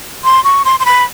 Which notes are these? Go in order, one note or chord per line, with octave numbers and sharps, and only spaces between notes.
C6
C#6
C6
C6
B5